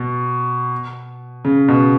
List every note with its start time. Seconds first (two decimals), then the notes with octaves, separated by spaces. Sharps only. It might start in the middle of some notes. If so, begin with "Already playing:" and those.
Already playing: B2
1.45 C#3
1.68 B2